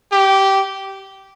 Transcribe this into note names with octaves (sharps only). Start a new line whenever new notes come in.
G4